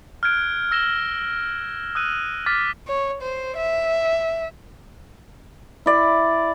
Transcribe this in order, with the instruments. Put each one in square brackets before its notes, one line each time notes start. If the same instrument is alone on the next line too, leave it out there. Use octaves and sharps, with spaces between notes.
[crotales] F6 F#6 G#6 D7
E6 A#6 E7 G7
D#6 E6 F#6 D#7
D6 F6 A6 B6
[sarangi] C#5
C5
E5
[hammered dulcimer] E4 D5